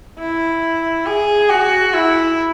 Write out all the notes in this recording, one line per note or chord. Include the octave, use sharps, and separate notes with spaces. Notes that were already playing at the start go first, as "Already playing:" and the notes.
E4
G#4
F#4
E4